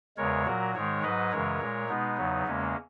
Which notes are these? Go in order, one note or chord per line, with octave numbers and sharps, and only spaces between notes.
E2 C#3 G#3 A#4 C#5
A#2 F#3 F#4 A#4
G#2 D#3 G#3 A#4 C#5
G#2 F#3 B4 D#5
F#2 C#3 E3 G#3 A#4 C#5
A#2 G#3
B2 G#3 B3 D#4
E2 C#3 F#3
E2 C#3 G#3 A#3 C#4